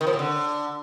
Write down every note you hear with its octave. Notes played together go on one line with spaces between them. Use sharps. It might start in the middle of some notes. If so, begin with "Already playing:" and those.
D#3
F3
A2
D3